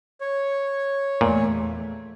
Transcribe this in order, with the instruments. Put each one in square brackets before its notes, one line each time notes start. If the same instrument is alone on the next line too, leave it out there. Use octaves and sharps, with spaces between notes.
[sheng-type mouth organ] C#5
[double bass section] E2 A3 [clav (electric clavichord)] A#2